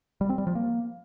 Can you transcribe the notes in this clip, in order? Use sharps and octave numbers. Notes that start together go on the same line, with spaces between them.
G3
C4
G3
F3
A#3